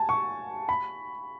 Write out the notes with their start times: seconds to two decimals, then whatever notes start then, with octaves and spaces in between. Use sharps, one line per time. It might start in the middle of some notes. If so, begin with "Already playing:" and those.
Already playing: G#5 A5
0.09 C#6
0.69 B5